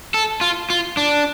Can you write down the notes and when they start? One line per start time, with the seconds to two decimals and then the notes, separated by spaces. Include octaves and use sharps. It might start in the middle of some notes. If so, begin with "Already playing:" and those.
0.14 A4
0.41 F4
0.70 F4
0.97 D4